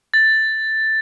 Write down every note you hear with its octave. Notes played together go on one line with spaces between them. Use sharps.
A6